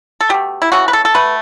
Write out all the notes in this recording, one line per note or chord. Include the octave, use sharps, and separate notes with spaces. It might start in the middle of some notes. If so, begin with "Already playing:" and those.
A4
B2 A3 G4
E4
C#3 E3 A3 F#4
B4
A4
A4
B2 A3 B4